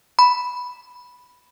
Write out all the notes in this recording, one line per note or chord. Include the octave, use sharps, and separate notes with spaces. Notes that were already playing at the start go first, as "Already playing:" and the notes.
B5